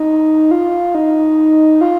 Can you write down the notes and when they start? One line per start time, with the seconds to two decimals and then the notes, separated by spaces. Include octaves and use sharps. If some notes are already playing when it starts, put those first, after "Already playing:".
Already playing: D#4
0.51 F4
0.95 D#4
1.81 F4